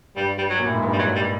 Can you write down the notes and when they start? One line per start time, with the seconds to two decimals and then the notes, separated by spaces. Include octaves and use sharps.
0.16 G2 G3
0.38 G3
0.50 F#3
0.59 A#2
0.67 A2
0.74 G#2
0.82 G2
0.93 G3
0.99 F#3
1.16 G3